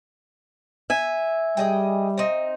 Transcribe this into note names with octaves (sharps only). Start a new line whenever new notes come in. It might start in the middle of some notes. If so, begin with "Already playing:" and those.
E5 G#5
G3 G#4 D#5 G5
C4 D#4